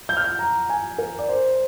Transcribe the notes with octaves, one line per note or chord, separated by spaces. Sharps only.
G6
F6
G6
A#5
G#5
A#4
D5
C5